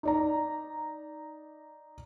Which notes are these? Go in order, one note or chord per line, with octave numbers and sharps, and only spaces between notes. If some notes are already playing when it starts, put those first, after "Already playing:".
D#4 D5 A#5